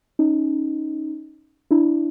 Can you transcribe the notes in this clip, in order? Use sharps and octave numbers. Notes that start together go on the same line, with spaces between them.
C#4 D#4
D4 E4